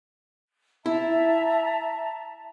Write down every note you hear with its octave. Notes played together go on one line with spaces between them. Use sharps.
E4 E5 A5 A#5